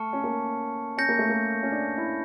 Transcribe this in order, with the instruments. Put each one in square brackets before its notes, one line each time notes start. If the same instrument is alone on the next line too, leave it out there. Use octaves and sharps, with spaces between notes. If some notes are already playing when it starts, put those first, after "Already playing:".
Already playing: [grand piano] A3 [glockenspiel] A5 C#6 F6 C#7
[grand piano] C#4
A#3
[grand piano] C#4 [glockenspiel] G6 A#6 C#7
[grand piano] A#3
A3
A#3
C#4
D4
E4